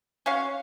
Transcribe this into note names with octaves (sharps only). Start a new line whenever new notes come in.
C#4 F#4 C#5 F5